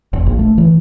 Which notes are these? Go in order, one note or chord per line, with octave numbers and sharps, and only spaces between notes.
F1
A#1
A3
E3